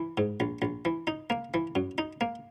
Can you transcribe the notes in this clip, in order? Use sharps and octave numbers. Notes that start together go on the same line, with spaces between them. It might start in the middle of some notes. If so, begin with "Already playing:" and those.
Already playing: E3
G#2
A#1
A#1
E3
D#4
A#3
E3
F#2
D#4
A#3